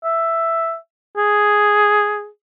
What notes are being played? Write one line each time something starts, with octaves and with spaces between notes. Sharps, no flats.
E5
G#4